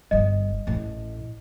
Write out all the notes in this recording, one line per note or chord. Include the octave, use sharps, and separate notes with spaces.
G1 G3 D#5
A1 A2